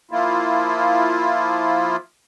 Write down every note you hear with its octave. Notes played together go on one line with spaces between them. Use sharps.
F3 A#3 E4 F4